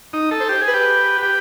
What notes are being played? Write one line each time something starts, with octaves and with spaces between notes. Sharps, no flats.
D#4
A4
C5
G4
G#4
B4
G4
G4